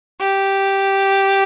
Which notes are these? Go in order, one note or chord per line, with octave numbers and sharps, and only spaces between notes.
G4